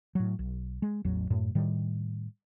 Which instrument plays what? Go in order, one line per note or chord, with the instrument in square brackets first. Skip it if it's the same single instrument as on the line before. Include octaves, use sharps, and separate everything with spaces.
[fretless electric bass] A2 F#3
B1
G#3
A1 E2 F#3
F#2 A2
A2 D#3 G3